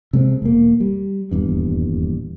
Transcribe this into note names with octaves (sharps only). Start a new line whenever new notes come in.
C3 G#3 C4
E1 A#3
G3
D#1 E2 G2